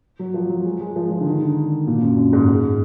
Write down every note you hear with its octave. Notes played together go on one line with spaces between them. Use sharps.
F#3
F3
F#3
G#3
G#3
F3
F3
D3
D#3
D3
A#2
F#2
F#2
G#2
G#2